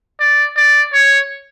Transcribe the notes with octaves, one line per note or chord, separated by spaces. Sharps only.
D5
D5
C#5